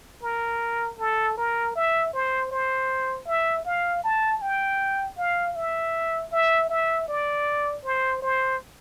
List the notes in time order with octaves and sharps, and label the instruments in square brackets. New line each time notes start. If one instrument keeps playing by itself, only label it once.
[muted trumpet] A#4
A4
A#4
E5
C5
C5
E5
F5
A5
G5
F5
E5
E5
E5
D5
C5
C5